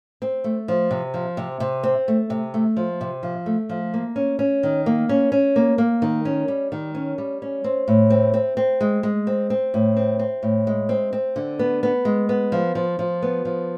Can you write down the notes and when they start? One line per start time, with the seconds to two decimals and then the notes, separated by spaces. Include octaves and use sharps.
0.22 C4
0.44 A3
0.68 F3
0.91 C3
1.14 F3
1.37 C3
1.60 C3
1.83 C4
2.08 A3
2.30 C3
2.54 A3
2.77 F3
3.01 C3
3.23 F3
3.46 A3
3.69 F3
3.94 A#3
4.16 C#4
4.39 C#4
4.63 D#3
4.86 A#3
5.09 C#4
5.32 C#4
5.56 A#3
5.78 A#3
6.02 D#3
6.25 C#4
6.48 G3
6.72 D#3
6.95 C#4
7.18 G3
7.42 C#4
7.64 C4
7.88 A2
8.10 C4
8.34 C4
8.57 C4
8.81 G#3
9.03 G#3
9.27 C4
9.50 C4
9.74 A2
9.97 C4
10.19 C4
10.43 A2
10.67 G#3
10.89 C4
11.13 C4
11.36 D3
11.59 B3
11.83 B3
12.05 G#3
12.29 B3
12.52 F3
12.75 F3
12.99 F3
13.22 B3
13.45 F3